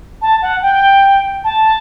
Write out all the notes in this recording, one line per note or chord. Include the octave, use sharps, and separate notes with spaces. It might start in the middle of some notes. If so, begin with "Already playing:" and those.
A5
F#5
G5
A5